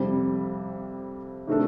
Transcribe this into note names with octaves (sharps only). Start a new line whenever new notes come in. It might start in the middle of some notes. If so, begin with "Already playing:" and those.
Already playing: F2 C3 G3 C4
C3 D#3 A3 D4 A4